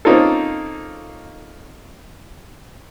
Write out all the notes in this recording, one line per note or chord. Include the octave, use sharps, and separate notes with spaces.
A#3 C4 C#4 D#4 F4 A4